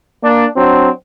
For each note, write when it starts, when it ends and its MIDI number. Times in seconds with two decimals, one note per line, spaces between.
0.23 0.46 58
0.23 0.46 62
0.56 0.89 54
0.56 0.89 60
0.56 0.89 62